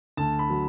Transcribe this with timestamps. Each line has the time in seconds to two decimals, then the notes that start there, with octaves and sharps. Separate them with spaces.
0.17 D2 A5
0.39 B5
0.50 F#3